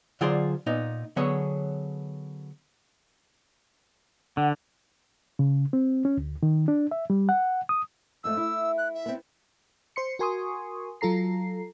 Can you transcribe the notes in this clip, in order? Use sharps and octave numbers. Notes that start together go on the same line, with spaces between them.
D3 F#3 F4 G#4 C5 D5
A#2 B3 D#4
D3 F#3 B3 G#4 C#5
D3 F#5
C#3
C4
C#4
D2
D#3
D4
E5
G3
F#5
D#6
F2 G#2 A3 E6
E4
F#6
E5
B3 C4
C5 C6 C#7
F#4 A#4 G#5 C6 C#6 D#6
F#3 F4 A4 A#5 C7